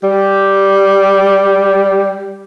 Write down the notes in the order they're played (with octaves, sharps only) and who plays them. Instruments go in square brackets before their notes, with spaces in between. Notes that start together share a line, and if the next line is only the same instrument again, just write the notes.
[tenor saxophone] G3 [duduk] G4